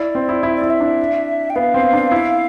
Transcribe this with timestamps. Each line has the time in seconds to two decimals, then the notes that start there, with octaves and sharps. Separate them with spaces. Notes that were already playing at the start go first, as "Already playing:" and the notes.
Already playing: E4 D5
0.15 C4
0.29 E4
0.43 E4 E5
0.56 D5
0.62 E4
0.70 E5
0.81 D4
1.50 G5
1.56 B3 F5
1.74 C4
1.93 D4
2.12 E4